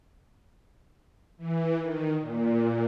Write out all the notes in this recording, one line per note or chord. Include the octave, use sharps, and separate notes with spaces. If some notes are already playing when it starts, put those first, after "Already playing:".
E3
D#3
A#2